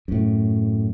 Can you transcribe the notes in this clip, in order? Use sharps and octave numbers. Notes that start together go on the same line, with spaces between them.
F#2 A2